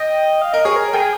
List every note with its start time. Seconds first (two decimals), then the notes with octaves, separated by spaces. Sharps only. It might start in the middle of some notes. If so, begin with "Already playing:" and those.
Already playing: D#5 G5
0.42 F5
0.53 A#4 D#5
0.65 G#4 C#5
0.76 A#4
0.93 G#4 G5